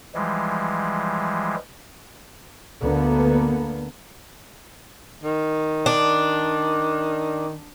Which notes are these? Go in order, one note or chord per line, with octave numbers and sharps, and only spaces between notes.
E3 F3 G3 G#3
D2 D3 A#3 B3
D#3
D4